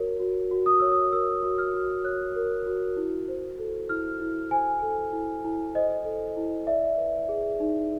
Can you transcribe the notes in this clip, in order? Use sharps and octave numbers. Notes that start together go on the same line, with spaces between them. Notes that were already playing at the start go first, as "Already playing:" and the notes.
Already playing: F#4 A#4 C#5
F#4
F#4
D#6
C#5 E6
D#6
A#4 E6
F#4
F6
F#4
C#5 F#6
A#4
F#4
E4
C5
A4
E4 F6
E4
C5 G#5
A4
E4
E4
C5 D#5
A4
E4
D5 E5
B4
G#4
D#4